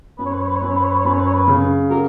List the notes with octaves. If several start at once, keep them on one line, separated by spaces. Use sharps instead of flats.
F#2 B4
C#5
B4
C#5
B4
C#5
F#2 B4
C#5
B4
C#5
B4
C#5
F#2 B4
C#5
B4
C#5
B4
C#3
F#3 A#4